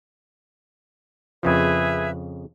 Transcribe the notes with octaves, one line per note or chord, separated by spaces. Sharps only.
F2 C#3 F3 G#4 B4 E5